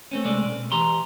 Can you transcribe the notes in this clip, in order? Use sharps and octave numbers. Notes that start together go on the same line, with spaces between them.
A3 C4 C#4
C2 G#3 A3 D5
B2
E3 G4 A#5 C6